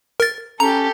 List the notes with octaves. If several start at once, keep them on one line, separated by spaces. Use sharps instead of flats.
A#4 A6
C#4 G4 A4 A#5